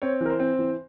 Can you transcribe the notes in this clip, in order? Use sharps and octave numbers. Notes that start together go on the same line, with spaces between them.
C4 C#5
E3 A#4
C5
C4
E3